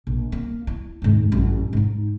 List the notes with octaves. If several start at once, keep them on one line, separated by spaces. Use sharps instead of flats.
A#1
A#3
E4
D#2 G#2
A1 F#2
G#2 D#4